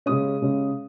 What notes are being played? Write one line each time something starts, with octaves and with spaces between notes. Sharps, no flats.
C#3 G#3 C#4 D#6
C#3 G#3 C#4